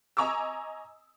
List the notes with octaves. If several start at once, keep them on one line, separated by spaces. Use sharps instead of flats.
D#5 G#5 A#5 C#6 D6 E6